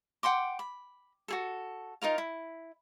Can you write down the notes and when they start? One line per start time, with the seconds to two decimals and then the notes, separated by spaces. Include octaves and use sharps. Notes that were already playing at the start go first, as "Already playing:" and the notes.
0.23 F#5 G5 C6 D6
0.59 B5
1.28 F#4 G#4 A4
2.02 D#4 F4 A#4 F5
2.18 E4